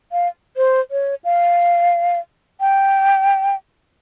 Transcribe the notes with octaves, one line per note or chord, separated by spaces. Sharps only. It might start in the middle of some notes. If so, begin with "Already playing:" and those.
F5
C5
C#5
F5
G5